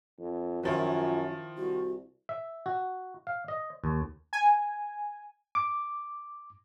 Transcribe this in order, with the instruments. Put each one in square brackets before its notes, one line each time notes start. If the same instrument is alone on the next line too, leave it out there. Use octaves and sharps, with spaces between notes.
[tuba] F2
[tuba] F#2 [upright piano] D#3 F3 E4 [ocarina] F4
[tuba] C2 [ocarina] F#4
[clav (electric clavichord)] E5
F#4
F5
D#5
D#2
[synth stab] G#5
[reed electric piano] D6